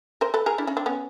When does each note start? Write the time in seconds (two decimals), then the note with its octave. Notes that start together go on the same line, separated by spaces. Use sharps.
0.21 A#4 C5
0.34 A4 B4
0.46 G#4 A#4
0.58 D4 E4
0.67 C#4 D#4
0.77 C4 D4
0.86 B3 C#4